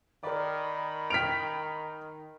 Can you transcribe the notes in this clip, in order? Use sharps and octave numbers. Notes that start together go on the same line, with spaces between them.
D#3 A#4 D5 B5
G5 F6 B6 D7 F7